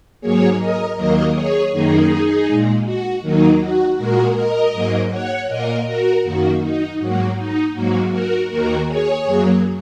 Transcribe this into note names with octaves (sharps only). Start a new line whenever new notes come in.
G#2 F#3 A#3 G#4 C#5
A#4 D#5
D#2 D#3 F#3 A#3 A#4 D#5
G#4 C#5
F#2 D#3 A#3 D#4 G#4
A#2 G#3
F#4
D#2 D#3 F#3 A#3 D#4
F#4
A#2 G#3 F#4 A#4
A#4 D#5
G#2 F#3 A#3
C#5 F#5
A#2 A#4 D#5
A#3
F#4 A#4
F#2 D#3 A#3 F#4
D#4
G#2 F#3 A#3 F#4
D#4
G#2 F#3 A#3 F#4
F#4 A#4
D#2 D#3 A#3 F#4 A#4
G#4 C#5
F#2 F#3 A#3